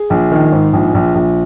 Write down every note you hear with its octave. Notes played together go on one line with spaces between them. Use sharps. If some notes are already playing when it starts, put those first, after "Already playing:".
Already playing: G#4
A#1
D#3
G#2
A#1
A#1
A#1